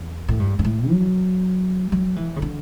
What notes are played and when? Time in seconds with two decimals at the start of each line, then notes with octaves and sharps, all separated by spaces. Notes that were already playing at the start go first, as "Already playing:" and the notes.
Already playing: E2
0.28 A2
0.40 G2
0.59 G2
0.65 A2
0.90 F#3
1.92 F#3
2.16 E3
2.36 C#3
2.42 D3